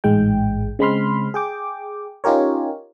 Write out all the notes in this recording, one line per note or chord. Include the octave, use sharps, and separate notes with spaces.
A1 G#2 G#3 G5
C#3 G#3 C4 B5 C6 F6
G#4 G5 D6
C#4 D#4 F4 G4 A#4 C#5